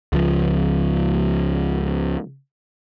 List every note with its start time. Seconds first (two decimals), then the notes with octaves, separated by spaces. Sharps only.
0.13 C#2 F3